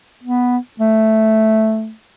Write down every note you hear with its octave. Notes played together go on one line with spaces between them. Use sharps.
B3
A3